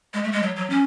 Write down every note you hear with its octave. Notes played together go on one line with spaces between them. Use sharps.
G#3
A3
G#3
F#3
F#3
C#4